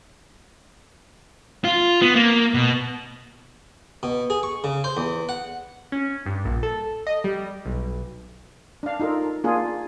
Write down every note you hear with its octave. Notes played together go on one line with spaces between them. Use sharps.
F4
B3
A#3
B2
B2
G#4
C#6
C#3
C5
E2
F#5
C#4
G2
A#1
A4
D#5
G3
B1
D4 F5
D#4 F4 A4 A#4
A#3 D4 F4 G#4